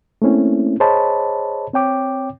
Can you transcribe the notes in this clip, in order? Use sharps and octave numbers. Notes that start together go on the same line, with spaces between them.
A3 A#3 C4 C#4 E4
G#4 C5 C#5 D#5 A5 B5
C4 C#5 G5 D6